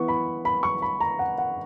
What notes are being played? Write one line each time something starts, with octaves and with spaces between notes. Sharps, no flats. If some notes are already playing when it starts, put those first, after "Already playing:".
Already playing: E3 B3 C#6
B5
B5
C#6
B5
A#5
F#5
F#5